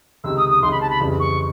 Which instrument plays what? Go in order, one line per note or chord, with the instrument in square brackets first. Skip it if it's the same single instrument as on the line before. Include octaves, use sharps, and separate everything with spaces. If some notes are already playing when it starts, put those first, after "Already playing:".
[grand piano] C#2 C3 D#3 [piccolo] E6
[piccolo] D#6
D#6
[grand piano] C#2 C3 D#3 [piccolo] C6
[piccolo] B5
A5
B5
[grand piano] F2 C#3 E3 G3
[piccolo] C#6